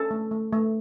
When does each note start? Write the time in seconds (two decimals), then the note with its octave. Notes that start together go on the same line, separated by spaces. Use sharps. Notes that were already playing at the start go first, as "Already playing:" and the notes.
Already playing: C#4 A4 A5
0.11 A3
0.31 A3
0.53 A3